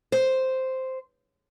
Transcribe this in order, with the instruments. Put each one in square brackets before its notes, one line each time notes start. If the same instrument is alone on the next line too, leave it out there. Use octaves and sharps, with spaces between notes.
[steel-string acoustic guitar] C5